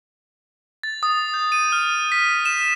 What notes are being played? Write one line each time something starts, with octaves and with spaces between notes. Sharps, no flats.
A6
D#6
G6
D#7
F6
B6
E7